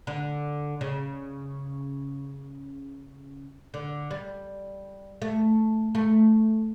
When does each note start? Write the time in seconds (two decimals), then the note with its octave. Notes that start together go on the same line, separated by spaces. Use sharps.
0.07 D3
0.81 C#3
3.74 D3
4.11 G3
5.22 A3
5.95 A3